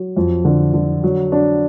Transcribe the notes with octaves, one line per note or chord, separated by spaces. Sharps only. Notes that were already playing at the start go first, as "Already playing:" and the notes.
Already playing: F#3
F2
D3
D3
F#3
D4